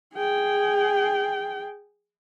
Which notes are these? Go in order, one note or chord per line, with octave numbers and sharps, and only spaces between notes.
G#4 G5